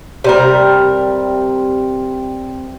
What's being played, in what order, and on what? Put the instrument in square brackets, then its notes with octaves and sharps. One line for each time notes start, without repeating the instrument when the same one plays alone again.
[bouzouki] C3 G3 A#4